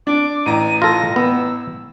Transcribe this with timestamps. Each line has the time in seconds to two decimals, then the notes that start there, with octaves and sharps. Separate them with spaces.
0.07 D4 D6
0.46 A1 A#5 D#7
0.82 F4 A4 A#6
1.16 B3 E6